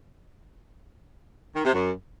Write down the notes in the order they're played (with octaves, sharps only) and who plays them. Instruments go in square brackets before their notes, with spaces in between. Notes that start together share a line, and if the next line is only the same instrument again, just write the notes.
[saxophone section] D#3
C3
F#2